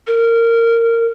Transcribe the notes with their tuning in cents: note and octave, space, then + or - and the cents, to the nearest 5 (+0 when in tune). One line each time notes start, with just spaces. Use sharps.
A#4 -20